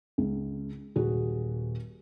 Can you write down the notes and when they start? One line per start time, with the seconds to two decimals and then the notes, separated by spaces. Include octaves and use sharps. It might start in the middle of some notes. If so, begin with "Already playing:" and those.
0.18 C#2
0.96 D#1 F#4 G#4